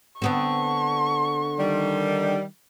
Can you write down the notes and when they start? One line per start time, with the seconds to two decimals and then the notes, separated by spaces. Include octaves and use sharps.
0.22 D3 B3 C4 C#6
1.59 D#3 G3